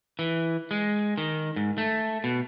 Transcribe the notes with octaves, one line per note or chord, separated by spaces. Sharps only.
E3
G#3
D#3
G#2
A3
B2